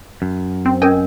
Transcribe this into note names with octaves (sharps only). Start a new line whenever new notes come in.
F#2
C4
C#4 A#4 D#5 G5 G#5